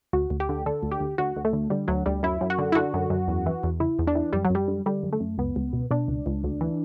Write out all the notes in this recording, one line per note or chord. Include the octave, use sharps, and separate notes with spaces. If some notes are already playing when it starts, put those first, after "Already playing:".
D2 F#4
D2
G4
D3
D3 A4
D2
G4
D2
D2 F#4
D2
A3
D3
D3 G3
D2 F#3
D2 G3
F#2 E4
F#2
F#4
D3
E4
D3 F#4
F#2
F#2
E2
E3
E2
C#3 E4
E2
D4
E3
F#2 G3
F#3
F#2 G3
D3
D3 G3
F#2
A3
F#2
C#2 B3
C#2
B2
B2 D4
C#2
C#2
D2
E3